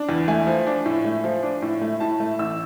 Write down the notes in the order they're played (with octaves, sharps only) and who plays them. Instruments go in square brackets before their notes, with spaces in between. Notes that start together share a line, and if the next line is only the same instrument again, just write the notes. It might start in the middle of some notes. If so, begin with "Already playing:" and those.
Already playing: [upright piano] D4
E2
A3 G#5
F3
D4
A2
A3
F3
D4
A2
A3
A2 A5
A3
A1 E6